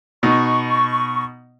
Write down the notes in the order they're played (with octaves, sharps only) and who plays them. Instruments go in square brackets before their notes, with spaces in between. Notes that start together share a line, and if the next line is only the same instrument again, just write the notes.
[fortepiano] B2 D#4 [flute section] C#6